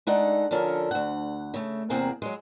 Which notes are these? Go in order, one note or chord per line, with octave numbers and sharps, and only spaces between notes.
G#3 D4 D#4 A4 F#5
D3 F3 C#4 A4 A#4
D2 F#5
C#3 A3
E2 C3 A#3 C4 G#4 F#5
F#3 G#3